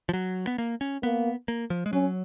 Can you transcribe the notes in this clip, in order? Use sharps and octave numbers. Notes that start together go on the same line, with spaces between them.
F3
F#3
B3
A#3
C#4
A#3 B3
A#3
F3
G#3
F#3 C#4